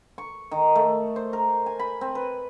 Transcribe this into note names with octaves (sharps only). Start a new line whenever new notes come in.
C#6
D#3
A3
C5
A#4
G#5
B5
C4
B4